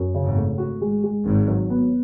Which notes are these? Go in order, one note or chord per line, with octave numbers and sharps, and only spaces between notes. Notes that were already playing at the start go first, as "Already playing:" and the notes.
Already playing: F#2
C#3
G#1 G#2
A3
F#4
G#3
G#3
G#1 G#2 D#3
F#3
B3